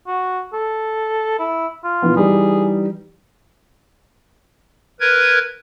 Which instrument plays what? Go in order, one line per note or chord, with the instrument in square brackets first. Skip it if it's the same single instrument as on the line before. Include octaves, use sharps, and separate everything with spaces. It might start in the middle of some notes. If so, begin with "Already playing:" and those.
[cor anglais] F#4
A4
E4
F4
[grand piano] A#2 E3 B3
[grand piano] E3 G3 D#4 [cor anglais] G#4
[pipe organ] A#4 B4 G#6